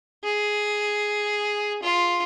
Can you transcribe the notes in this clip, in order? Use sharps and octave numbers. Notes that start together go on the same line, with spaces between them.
G#4
F4